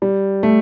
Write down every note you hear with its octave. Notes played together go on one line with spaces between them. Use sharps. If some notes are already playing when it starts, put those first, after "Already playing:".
G3
A3